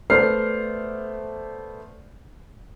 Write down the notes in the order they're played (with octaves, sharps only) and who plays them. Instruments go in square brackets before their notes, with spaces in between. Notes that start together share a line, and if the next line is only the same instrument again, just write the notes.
[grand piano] A3 B3 C5 D5 F6 C7